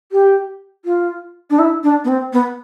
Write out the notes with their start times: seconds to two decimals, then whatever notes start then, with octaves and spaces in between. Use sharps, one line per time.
0.12 G4
0.85 F4
1.50 D4
1.59 E4
1.83 D4
2.04 B3
2.08 C4
2.33 B3